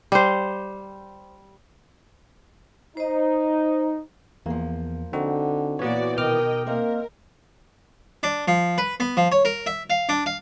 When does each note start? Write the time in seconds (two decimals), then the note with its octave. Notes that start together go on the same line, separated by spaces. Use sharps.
0.12 G3 C5
2.97 D#4 C5 D#5
4.46 E2 F3 A#3
5.13 D3 C4 D#4 F#4
5.79 A#2 E3 B3 F#4 C#5 D5
6.18 B2 D#3 A#4 D#5 G5 D6 F6
6.67 A#3 C4 A#4 D#5 E5
8.23 D4
8.48 F3
8.78 B4
9.00 B3
9.17 F3
9.32 C#5
9.45 A#4
9.66 E5
9.90 F5
10.09 D4
10.26 F5